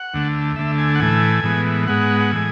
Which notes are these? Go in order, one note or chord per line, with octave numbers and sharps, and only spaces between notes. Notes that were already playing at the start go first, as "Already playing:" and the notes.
Already playing: F#5
D2 D3 A3
D2 D3 A3 E5
G#5
F#5
A2 E3 A3 G#5
A2 E3 G#3 B3
G#2 G#3 B3 F#5
F#5
A2 E3 G#3 G#5